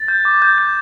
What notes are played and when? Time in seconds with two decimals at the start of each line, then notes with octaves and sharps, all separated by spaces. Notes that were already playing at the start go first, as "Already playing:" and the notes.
Already playing: A6
0.08 G6
0.25 D6
0.42 G6
0.58 G6